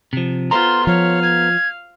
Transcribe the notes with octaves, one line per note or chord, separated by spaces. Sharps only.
C3 F3
B3 F4 A4 C5 A#5 C6
F3 C#5 F5
G#6